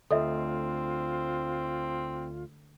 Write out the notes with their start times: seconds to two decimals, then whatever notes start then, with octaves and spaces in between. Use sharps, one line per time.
0.11 D2 C4 F4 A4 D#5 E5